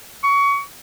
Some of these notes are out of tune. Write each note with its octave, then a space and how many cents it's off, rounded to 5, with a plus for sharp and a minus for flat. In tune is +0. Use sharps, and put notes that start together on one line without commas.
C#6 +25